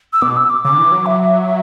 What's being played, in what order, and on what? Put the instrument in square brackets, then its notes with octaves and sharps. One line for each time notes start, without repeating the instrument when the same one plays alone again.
[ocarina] E6
[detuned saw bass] B2 [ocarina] D6
[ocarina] E6
D6
[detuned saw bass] C#3 [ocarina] D6
[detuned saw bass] D3
E3
F#3
[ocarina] E5